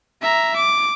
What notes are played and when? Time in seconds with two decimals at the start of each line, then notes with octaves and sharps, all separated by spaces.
0.22 E5 A#5
0.56 D6